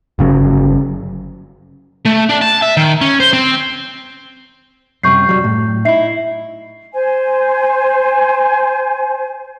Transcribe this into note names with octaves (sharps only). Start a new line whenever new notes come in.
G1 C#3 F#3
A3
D4
A5
E5
D#3
C#4
C5
C4
F#2 C3 G3 C#6 G6 C7
F#3 G3
A2
D#4 E4 E5 C7
C5 G#5